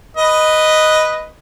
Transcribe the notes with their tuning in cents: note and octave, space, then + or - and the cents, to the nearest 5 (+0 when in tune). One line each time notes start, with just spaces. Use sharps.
B4 +0 D#5 +0